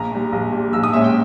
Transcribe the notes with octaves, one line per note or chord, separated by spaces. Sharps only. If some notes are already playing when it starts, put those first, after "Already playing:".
Already playing: A#1 A#5
A#2 G3
A#1
A#2 G3
A#1 E6
D#6
A#2 G#3 C#4 E5
G5